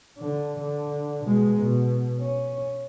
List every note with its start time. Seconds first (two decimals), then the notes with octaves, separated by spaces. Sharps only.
0.18 D3
0.59 D3
1.25 B2 G#3
1.56 B2
2.20 C#4